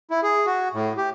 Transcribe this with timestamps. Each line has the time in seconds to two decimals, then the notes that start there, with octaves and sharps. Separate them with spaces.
0.11 E4
0.23 G#4
0.46 F#4
0.73 A2
0.97 G4